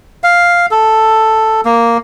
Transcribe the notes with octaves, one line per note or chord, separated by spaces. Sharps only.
F5
A4
A#3